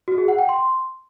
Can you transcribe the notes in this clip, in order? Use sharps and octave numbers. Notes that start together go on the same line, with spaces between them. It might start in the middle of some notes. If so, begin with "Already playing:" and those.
F#4
G#4
F#5
G5
C6